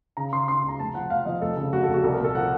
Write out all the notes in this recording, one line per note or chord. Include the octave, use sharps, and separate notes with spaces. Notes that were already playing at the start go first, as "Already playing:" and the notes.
C#3 A#5
C#3 C6
C#3 C6
C#2 A#5
F1 A5
F3 F#5
F1 F5
F3 D#5
F1 A4
C#3
F1 F#4
A4
F1
F#4
C2 A4
A#4
A#2 A4
F3 F#5